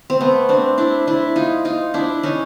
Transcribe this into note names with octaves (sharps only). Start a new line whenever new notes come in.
C4
A3 B3
C4 D4
D4 E4
D4 E4
D#4 F4
D#4 F4
D4 E4
C#4 D#4